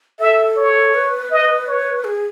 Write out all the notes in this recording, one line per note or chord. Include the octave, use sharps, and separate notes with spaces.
A4 E5
C#5
B4
D#5
C#5
G#4